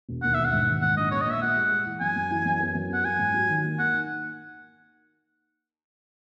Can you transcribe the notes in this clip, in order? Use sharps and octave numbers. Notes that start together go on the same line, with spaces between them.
E1
D#2 F#5
E1 E5
F#5
G#2
D#3
G#2 F#5
A#1 D#5
B3 C#5
D#5
A#2 E5
A#2 F#5
G#3
G#3
E3
F#2 G#5
F#2
E3
F#2
B3
F#2
B3 F#5
F#3 G#5
G#2
F#3
D#3
A#3
A#3 F#5
D#4